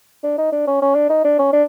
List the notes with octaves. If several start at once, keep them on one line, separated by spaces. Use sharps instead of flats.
D4
D#4
D4
C#4
C#4
D4
D#4
D4
C#4
D4